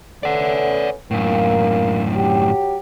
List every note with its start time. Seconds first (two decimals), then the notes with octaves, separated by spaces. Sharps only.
0.23 A3 B3 C#4 D5 F#5
1.11 F#2 A2 A#3
2.14 F#3 G4